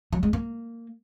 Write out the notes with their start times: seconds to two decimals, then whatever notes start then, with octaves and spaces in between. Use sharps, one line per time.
0.13 F#3
0.23 G#3
0.33 A#3